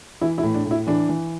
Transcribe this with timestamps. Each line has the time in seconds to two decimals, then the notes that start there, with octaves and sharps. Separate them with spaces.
0.21 E3 E4
0.38 E4
0.43 A2
0.54 D4
0.65 A2
0.71 E4
0.87 E3 D4
1.09 E3